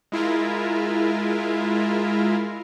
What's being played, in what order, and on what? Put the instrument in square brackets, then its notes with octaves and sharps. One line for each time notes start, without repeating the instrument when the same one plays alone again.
[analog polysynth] G#3 E4 F4 A#4